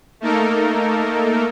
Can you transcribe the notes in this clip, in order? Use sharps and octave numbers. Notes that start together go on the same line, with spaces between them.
A3 A#3 D#4 A4 A#4